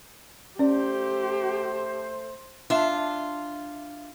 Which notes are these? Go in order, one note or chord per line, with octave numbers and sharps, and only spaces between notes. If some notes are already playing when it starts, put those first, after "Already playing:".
A3 C#4 G4 A4 C5 D5
D4 F4 E5